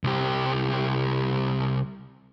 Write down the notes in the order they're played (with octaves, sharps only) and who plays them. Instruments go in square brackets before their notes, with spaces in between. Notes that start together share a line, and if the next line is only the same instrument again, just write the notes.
[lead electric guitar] C2 G4